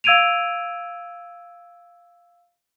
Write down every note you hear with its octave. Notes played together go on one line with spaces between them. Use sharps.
F5 E6 G#6 D7 D#7 F7